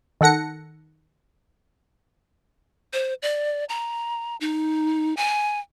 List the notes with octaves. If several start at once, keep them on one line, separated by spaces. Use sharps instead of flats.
D#3 A4 F#5 A#6 C#7
C5
D5
A#5
D#4
G#5